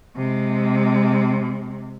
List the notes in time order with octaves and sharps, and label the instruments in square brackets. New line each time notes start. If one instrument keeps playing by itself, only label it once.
[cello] C3 G#3